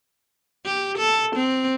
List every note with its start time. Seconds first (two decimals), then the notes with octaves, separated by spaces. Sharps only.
0.65 G4
0.98 A4
1.36 C4